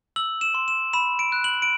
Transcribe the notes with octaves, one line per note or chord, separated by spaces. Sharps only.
E6 F#7
E7
C6
E7
B5 E7
D7
F#6
F#7
D7